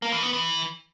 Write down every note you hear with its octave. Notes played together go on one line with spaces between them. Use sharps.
A#3
E3
B3
E3